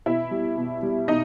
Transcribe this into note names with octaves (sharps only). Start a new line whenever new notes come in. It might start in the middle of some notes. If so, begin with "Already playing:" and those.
B2 E4 E5
G3
B2
G3
B2 D#4 D#5